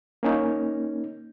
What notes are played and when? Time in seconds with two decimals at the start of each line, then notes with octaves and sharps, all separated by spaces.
0.23 A#3 C#4 D#4